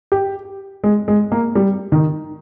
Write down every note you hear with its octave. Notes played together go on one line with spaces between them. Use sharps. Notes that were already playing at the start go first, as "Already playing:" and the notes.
G4
G#3
G#3
A#3
G3
D#3